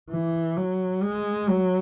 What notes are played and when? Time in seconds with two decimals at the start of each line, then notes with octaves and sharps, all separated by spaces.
0.10 E3
0.57 F#3
1.03 G#3
1.49 F#3